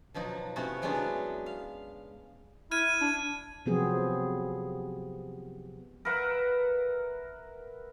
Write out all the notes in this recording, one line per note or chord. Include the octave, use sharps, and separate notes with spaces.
B2 F3 F#3 D#4
C3 A3 B3 C#4 E4 F#4
C3 F#3 G#3 B3 C#4 D4
B4
F5
E4 F6 G#6 D#7
D4
C3 F3 F#3 B3 C4 G#4
A#4 B4 E5 F#5